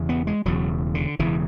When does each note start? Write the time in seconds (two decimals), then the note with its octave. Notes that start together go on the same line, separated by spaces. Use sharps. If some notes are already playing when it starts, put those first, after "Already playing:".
Already playing: E1 E2 C#3
0.09 B3
0.27 G#3
0.45 E1 E2 C#3 F#3
0.95 D3
1.19 E1 E2 C#3 E3